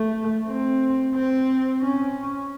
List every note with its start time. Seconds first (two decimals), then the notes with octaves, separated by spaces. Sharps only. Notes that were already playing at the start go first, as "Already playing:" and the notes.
Already playing: A3
0.47 C4
1.15 C4
1.82 C#4